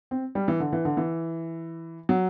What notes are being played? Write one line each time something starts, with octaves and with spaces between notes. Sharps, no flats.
C4
G3
E3
D3
E3
D3
E3
F#3